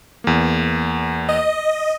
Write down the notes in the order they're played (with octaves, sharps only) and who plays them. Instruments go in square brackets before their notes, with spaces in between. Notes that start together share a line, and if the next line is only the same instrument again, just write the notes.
[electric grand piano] E2 A#3
[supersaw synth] D#5